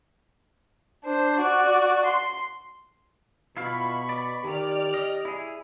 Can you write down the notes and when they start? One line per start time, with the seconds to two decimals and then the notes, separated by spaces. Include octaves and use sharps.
1.04 D4 C5
1.39 F#4 D5
2.05 C6
3.57 B2 E4 F4 F5 B5 C#6
4.09 D5
4.44 D#3 G4 D5 F6
4.94 D#5
5.25 E4 G#4